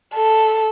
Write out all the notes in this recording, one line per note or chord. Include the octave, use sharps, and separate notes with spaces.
A4